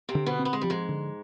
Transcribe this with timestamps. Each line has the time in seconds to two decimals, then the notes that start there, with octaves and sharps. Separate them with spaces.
0.09 C3 C4
0.15 D3
0.26 B2 B3
0.39 C4
0.45 B3
0.53 G#3
0.61 F3 G3
0.70 G#2 G#3
0.89 D3